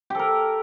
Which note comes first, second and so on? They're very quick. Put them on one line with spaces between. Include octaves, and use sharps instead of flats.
G4 A4 A#4